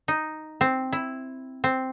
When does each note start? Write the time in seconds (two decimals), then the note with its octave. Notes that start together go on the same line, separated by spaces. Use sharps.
0.08 D#4
0.61 C4
0.93 E4
1.64 C4